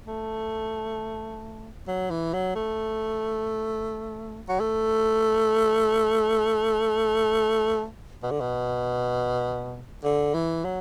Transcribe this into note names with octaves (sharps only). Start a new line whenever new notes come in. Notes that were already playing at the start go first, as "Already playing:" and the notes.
A3
F#3
E3
F#3
A3
F#3
A3
B2
D3
B2
D3
E3
F#3